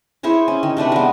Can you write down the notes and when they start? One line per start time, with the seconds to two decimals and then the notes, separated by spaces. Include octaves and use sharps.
0.23 E4 G#4 C5 C#5
0.48 C#4
0.63 D#3
0.77 C3 A3 D4 B4
0.92 G#3 B3